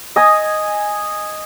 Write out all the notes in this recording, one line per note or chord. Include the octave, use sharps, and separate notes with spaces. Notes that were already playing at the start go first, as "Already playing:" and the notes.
D#5 G#5 D#6